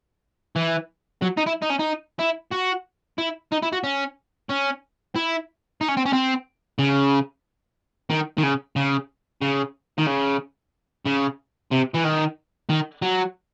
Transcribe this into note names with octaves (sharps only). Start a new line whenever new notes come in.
E3
F#3
D#4
E4
D#4
C#4
D#4
E4
F#4
E4
D#4
E4
F#4
C#4
C#4
E4
D#4
C#4
C4
C#4
C4
C#3
D#3
D#3
C#3
C#3
C#3
D#3
C#3
C#3
C3
E3
D#3
D#3
F#3